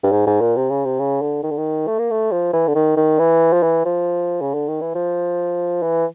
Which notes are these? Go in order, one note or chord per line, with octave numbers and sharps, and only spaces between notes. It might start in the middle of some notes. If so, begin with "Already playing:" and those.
G2
G#2
G#2
A#2
C3
C#3
C3
C#3
D3
D#3
D3
D#3
A3
A#3
A3
F3
E3
D3
D#3
D#3
E3
F3
E3
F3
C#3
D3
D#3
E3
F3
E3